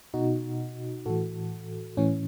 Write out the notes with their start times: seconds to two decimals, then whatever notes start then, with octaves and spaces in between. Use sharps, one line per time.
0.14 B2 D#4 F#4
1.06 A2 E3 F#4 A4
1.97 A2 E3 C#4